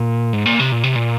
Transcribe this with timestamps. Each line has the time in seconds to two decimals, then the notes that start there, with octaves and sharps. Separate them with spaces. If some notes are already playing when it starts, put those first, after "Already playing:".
Already playing: A#2
0.33 G#2
0.46 A#2
0.59 C3
0.72 A#2
0.84 C3
0.96 A#2